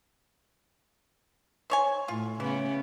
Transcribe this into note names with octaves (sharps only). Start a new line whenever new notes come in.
C5 C#5 G#5
A2 F4
C#3 E3 B3